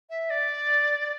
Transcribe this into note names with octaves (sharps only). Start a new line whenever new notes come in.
E5
D5